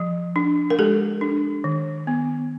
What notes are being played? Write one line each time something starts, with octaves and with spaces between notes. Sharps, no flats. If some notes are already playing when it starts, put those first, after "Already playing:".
Already playing: F3
D4
A#4
G#3 G4 A4
D4
D#3
B3